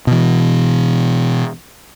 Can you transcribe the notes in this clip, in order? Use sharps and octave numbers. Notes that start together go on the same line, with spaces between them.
B2 E3